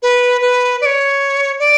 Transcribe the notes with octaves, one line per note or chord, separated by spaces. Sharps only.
B4
B4
D5
C#5
D5